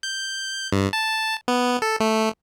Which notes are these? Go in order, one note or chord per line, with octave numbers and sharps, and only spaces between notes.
G6
G2
A5
B3
A4
A3